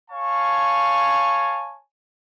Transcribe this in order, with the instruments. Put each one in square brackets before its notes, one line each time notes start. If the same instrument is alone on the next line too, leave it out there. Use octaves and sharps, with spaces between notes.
[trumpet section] C#5 F5 G#5 A5 C#6